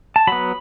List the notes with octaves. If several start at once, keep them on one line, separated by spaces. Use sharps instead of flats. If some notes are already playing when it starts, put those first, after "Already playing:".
A5
F#3 B3 B5